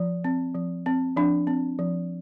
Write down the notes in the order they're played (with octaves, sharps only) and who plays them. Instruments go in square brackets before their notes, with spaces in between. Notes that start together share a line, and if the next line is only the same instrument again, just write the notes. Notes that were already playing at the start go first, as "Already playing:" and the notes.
Already playing: [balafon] F3
C4
F3
C4
F3 D4
C4
F3